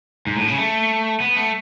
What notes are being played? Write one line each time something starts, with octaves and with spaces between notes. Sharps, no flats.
G#2
A2
C#3
A3
B3
A3